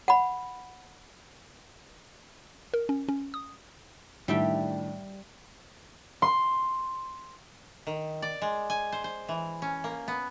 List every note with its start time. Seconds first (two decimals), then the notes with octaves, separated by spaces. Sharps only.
0.08 F#5 B5
2.74 A#4
2.89 C#4
3.09 C#4
3.34 D#6
4.28 A2 D#3 G3 D4 E5 G5
6.22 C6
7.87 D#3
8.22 D5
8.42 G#3
8.70 G#5
8.92 C5
9.04 C5
9.29 E3
9.62 C#4
9.84 A#3
10.08 B3